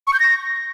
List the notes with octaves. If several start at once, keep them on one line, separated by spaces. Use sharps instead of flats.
C#6
G6
A#6